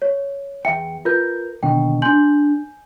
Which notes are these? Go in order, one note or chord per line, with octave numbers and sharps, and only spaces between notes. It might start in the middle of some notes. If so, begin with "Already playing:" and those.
C#5
E2 E5 G5 C#7
F4 A#4 B4 G6
D#2 B2 D3 G5
D4 G#5 C6 G6 F#7